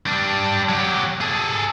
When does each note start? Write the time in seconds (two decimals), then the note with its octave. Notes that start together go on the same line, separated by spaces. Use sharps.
0.06 G3 D4
0.69 F#3 G4
1.21 G#4 A4